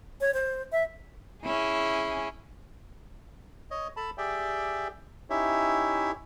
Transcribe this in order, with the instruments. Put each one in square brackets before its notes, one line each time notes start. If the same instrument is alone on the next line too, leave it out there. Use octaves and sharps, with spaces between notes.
[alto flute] C#5
C5
E5
[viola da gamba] C#4 E4 G#4
[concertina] C#5 D#5
A4 A5 B5
G4 G#4 D5 E5 G5
C#4 D#4 E4 G4 C#5 E5